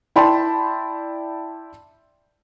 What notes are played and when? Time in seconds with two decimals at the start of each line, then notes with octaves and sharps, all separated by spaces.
0.16 E4 D5 G5 A5 B5 C6